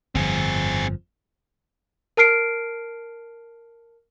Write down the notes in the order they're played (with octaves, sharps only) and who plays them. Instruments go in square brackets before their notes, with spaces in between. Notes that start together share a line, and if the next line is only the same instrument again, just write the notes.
[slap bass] G1 F2 F3 [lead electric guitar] C4 G#4
[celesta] A#4 A5 F6 C7 D7